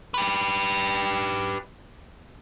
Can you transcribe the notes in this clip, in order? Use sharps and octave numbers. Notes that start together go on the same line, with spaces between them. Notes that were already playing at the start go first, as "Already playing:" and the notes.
G4 B4